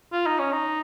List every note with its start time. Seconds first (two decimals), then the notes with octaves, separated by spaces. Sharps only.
0.13 F4
0.27 D#4
0.39 C#4
0.52 D#4